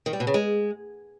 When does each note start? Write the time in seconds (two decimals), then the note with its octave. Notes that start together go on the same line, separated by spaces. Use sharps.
0.06 D#3
0.13 G3
0.20 B2
0.27 C#3
0.34 G#3